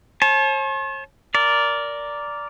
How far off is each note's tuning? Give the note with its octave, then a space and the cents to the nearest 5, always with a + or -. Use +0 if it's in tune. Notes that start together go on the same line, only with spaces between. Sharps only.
C#5 -45 A5 -40
A#4 +0 D5 -10